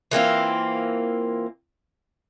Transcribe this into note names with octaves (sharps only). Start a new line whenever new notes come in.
E3 A#3 C4 F4